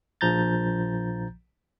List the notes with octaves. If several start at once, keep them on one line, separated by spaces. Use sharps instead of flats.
A#1 F3 A#5 G6 A6